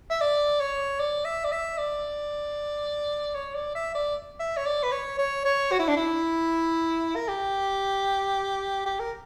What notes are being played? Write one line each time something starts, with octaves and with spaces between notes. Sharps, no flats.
E5
D5
C#5
D5
E5
D5
E5
D5
C#5
D5
E5
D5
E5
C#5
D5
B4
C#5
C#5
C#5
F#4
E4
D4
E4
A#4
G4
G4
A#4